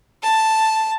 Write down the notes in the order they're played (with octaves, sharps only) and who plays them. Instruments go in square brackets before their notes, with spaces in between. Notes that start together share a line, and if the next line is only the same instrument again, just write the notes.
[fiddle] A5